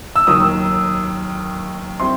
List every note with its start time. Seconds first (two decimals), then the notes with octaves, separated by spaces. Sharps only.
0.16 E6
0.27 D#2 D#3 F#3 D#6
2.00 G3 C4 E4 C6